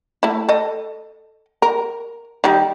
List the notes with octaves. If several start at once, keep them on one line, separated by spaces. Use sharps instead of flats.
A3 E4
A4 D#5
A#4
D#3 G3